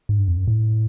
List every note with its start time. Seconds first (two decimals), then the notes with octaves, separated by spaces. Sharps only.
0.09 G#2
0.19 G2
0.28 F2
0.37 F#2
0.48 A2